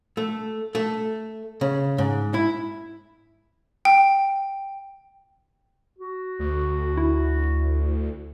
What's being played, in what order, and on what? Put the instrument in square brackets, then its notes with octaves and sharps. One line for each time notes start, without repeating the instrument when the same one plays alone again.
[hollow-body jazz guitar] A3
A3
C#3
G#2
E4
[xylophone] G5
[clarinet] F#4
[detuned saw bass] D2
[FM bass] E4